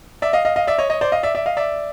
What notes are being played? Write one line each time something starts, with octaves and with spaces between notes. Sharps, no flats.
D5 E5
D#5 F5
D#5 F5
D#5 F5
D5 E5
C#5 D#5
C#5 D#5
C5 D5
D#5 F5
D5 E5
D5 E5
D#5 F5
D5 E5